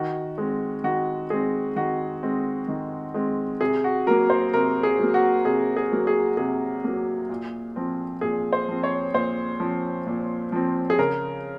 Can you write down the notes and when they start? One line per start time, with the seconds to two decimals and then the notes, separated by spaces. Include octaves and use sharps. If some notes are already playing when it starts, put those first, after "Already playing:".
Already playing: D#3 F#4
0.38 G#3 C4
0.84 D#3 F#4
1.30 G#3 C4 G#4
1.76 D#3 F#4
2.23 G#3 C4
2.68 D#3
3.14 G#3 C4
3.61 C3 G#4
3.84 F#4
4.07 F#3 A#3 A#4
4.30 C5
4.53 C3 A#4
4.83 G#4
4.99 F#3 A#3
5.14 F#4
5.45 C3 G#4
5.77 G#4
5.92 F#3 A#3
6.07 G#4
6.37 C3 G#4
6.84 F#3 A#3
7.29 A#2
7.76 F3 C4
8.21 A#2 G#4
8.53 C5
8.68 F3 C4
8.83 C#5
9.14 A#2 C5
9.60 F3 C4
10.07 A#2
10.52 F3 C4
10.90 G#4
10.99 C#3 A#4